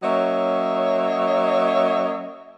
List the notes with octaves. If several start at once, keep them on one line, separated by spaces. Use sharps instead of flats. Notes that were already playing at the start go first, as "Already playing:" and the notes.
F#3 A#3 C#4 C#5 D#5 E5